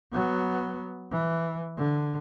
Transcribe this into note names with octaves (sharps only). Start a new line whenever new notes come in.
F#3 B3
E3
D3